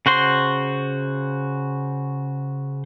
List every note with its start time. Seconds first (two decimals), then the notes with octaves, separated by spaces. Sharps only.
0.06 C#3 F#4 C5 C6